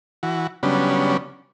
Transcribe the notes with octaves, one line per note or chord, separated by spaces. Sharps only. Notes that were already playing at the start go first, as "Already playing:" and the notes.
E3 F#4
C#3 F#3 G3 B3 C#4 D4